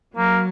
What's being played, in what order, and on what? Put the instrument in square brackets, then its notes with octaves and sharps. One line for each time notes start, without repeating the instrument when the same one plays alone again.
[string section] F#3 [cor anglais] A#3